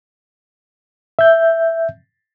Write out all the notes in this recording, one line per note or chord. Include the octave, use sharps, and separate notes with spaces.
E5 G6